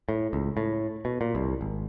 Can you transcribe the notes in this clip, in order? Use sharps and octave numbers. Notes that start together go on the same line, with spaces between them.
A2
C#2
A2
B2
A#2
C2
G#1